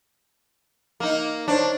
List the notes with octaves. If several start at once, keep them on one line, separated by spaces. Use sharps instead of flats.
A#3 D#4
D4 C5 C#5 A5